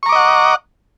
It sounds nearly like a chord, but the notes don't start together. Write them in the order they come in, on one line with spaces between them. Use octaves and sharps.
C#6 A#5 D6 D#5 F#5